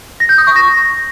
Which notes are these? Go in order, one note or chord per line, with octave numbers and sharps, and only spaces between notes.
A#6
G6
D#6
C#6
A#6